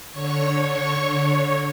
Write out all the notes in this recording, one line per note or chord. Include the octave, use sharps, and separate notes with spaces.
D3 C#5 C#6